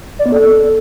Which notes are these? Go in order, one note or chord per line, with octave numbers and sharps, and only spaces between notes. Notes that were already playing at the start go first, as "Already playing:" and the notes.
D5
B3
A4